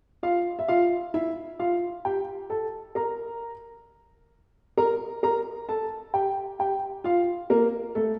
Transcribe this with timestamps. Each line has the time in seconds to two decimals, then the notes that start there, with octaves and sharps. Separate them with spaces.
0.23 F4 F5
0.59 E5
0.68 F4 F5
1.14 E4 E5
1.59 F4 F5
2.05 G4 G5
2.50 A4 A5
2.95 A#4 A#5
4.78 A#4 A#5
5.23 A#4 A#5
5.69 A4 A5
6.14 G4 G5
6.59 G4 G5
7.04 F4 F5
7.50 A#3 A#4
7.95 A3 A4